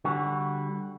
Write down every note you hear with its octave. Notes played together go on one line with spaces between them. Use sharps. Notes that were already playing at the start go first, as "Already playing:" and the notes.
D3 G3 F#4